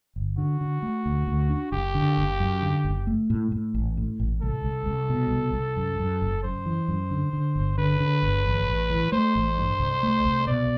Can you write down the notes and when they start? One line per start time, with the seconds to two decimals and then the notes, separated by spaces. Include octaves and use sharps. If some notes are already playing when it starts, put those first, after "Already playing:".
0.16 G1
0.38 D3 F#4
0.61 D3
0.82 A3
1.06 D2
1.28 D2
1.50 D4
1.72 F#1 G4
1.95 D3
2.17 F#1
2.40 F#2
2.62 D3
2.85 F#1
3.07 A3
3.30 A2
3.52 A2
3.74 A1
3.97 A2
4.20 A1
4.42 C2 A4
4.64 C2
4.86 C2
5.10 B2
5.31 C2
5.53 C2
5.76 F#2
5.99 F#2
6.22 F#1
6.43 F#2 C5
6.66 E3
6.88 F#2
7.11 D3
7.33 D3
7.55 G1
7.78 D3 B4
8.00 D3
8.23 G1
8.46 A1
8.68 A1
8.90 E3
9.12 A3 C5
9.36 A1
9.57 G2
9.80 C2
10.03 A3
10.25 C2
10.47 B2 D5